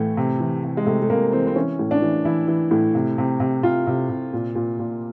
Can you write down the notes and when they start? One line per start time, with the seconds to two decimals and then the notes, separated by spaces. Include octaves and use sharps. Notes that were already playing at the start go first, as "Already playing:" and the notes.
Already playing: A2 E3 A3
0.17 C3
0.40 E3
0.64 C3
0.77 G#3
0.86 C3 A3
1.02 A3
1.10 C3 A#3
1.32 E3 C4
1.47 C4
1.55 E3 C#4
1.79 A2
1.91 D4
2.02 E3
2.25 E3 E4
2.48 E3
2.71 A2
2.95 C3
3.18 C3
3.40 C3
3.63 C3 F4
3.87 C3
4.09 C3
4.33 A#2
4.55 A#2
4.79 A#2